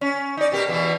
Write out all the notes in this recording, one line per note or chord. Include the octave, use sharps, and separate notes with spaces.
C#4
D#4 D5
B2 G4 A#4
E2 B2 E3